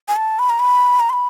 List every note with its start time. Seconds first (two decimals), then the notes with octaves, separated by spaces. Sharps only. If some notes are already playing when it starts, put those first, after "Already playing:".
0.08 G#5
0.16 A5
0.39 B5
0.50 A#5
0.59 B5
1.00 A#5
1.10 C6
1.13 B5